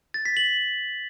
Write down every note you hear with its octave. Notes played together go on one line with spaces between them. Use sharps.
A6
B6
F#7